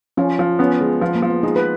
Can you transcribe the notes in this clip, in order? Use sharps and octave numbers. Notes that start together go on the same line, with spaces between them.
F3 C#4
F3
B3 C#4
G#3
F3 B3
A#3
F3
B3
G#3 D#4
B4